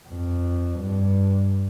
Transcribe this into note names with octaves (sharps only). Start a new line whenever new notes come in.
F2
G2